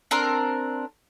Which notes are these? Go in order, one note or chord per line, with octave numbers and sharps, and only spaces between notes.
C4 D4 A#4 C6